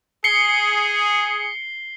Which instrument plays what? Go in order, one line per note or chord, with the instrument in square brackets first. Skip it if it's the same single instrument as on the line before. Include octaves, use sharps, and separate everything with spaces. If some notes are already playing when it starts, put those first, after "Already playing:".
[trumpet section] G#4 [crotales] C7 G7 [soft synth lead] C#7